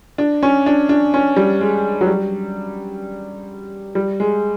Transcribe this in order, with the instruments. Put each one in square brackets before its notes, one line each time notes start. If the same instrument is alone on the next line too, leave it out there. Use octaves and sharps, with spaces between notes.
[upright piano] D4
C#4
D4
D4
C#4
G3
G#3
F#3
G3
G3
G#3